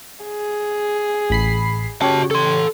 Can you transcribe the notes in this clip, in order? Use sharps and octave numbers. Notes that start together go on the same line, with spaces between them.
G#4
A1 B5 C7
C#3 F#4 G4 C#5 A5
A4 C6